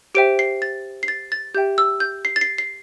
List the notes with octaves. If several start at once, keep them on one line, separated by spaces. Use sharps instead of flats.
G4 C5 E5 G5 D7
C7
A6
C7
A6
A6
G4 E5 G5 G6
E6
G6
C7
A6
C7
C7